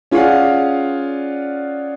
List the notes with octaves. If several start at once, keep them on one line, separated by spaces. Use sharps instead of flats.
C#4 F4 G#4 D5 F5 F#5